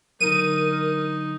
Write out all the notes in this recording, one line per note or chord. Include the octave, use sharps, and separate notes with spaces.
D3 F#3 D#4 A#4 D#7